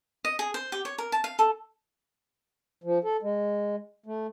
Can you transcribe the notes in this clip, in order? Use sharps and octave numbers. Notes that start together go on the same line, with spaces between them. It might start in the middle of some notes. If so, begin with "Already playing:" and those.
D#5
G#4
C5
G4
C#5
A#4
A5
F5
A4
F3
A4
G#3
A3